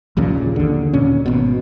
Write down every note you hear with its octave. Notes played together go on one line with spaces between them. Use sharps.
A#1 D#2 A#2 C#3
D#2 D3
D#2 A#2 C#4
G#1 B2